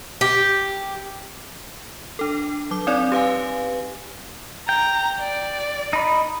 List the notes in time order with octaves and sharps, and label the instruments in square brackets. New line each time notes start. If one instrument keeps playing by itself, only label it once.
[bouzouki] G4
[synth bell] D4 A4
F#3 D6
C4 D#4 C#5 D5
G4 B4 F5 G#5
[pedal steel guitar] G5 [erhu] A#5
[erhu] D5
[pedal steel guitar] D#4 B5